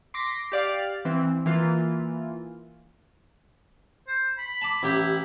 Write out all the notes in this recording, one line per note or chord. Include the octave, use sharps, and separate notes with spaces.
C6 D6 A#6 B6
G4 D5 F5
E3 C4
E3 A#3 F4
C5
B5
A5 D6
A1 E4 G4 B5